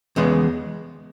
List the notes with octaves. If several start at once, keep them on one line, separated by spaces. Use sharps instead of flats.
E2 C#3 G#3 B3